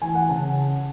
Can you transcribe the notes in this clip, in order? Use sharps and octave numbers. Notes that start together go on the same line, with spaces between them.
E3 G#5
F#5
C#3 A5